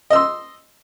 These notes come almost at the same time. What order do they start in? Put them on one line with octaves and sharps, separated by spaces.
D#5 E6 C6